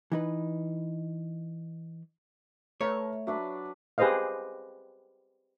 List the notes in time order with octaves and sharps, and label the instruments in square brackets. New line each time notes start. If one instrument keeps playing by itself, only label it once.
[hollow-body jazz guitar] E3 D#4 B4
[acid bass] A3 [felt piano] B4 A#5 F6 [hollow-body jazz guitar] C#5
[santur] F#3 D4 B4 [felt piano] E5
[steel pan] G4 G#4 B4 C5 D#5 F5